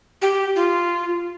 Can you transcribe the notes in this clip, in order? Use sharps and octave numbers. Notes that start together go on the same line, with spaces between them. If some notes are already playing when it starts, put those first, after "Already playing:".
G4
F4